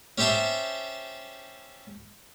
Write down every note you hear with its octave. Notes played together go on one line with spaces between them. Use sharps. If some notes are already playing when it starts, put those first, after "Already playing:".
C#4 G4 C5 E5 A5